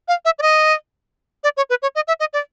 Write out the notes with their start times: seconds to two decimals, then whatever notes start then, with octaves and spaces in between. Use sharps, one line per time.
0.08 F5
0.25 E5
0.39 D5
0.42 D#5
1.44 D5
1.57 C#5
1.70 B4
1.82 C#5
1.95 D#5
2.08 E5
2.20 D#5
2.33 D5